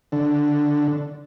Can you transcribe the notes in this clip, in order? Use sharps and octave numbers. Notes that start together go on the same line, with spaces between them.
D3